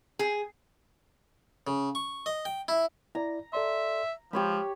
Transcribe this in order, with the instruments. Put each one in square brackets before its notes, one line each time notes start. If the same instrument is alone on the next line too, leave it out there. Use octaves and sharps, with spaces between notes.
[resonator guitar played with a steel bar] G#4
[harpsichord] C#3
C#6
D#5
G5
E4
[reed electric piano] E4 D5 [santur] A#5
[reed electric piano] A4 D5 C6 [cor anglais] E5
[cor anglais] F3 [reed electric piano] G#3 [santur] G4 C#5 B5